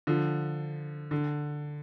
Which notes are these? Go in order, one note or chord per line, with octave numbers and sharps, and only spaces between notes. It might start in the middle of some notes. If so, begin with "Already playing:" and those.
D3 F3
D3